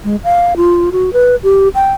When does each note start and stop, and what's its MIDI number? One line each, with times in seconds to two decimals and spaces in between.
0.04 0.16 56
0.24 0.54 77
0.57 0.90 65
0.92 1.13 66
1.13 1.36 71
1.43 1.68 67
1.75 1.93 79